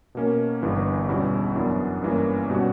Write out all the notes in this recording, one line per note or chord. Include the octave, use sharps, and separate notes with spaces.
B2 A#3 C#4
G1 G2 E3
E2 B2 G3 C#4 E4
F#2 E3 B3 D4
G2 E3 A#3 C#4
B2 G3 C#4 F#4